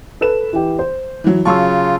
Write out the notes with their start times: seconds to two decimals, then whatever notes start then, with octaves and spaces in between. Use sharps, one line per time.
0.21 A4 B4 E7
0.53 E3 G4
0.79 C5
1.24 E3 F#3
1.45 C#3 F#3 F4 A5 C6 C#6 E6